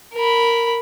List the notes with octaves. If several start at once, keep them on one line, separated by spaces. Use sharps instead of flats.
A#4 B5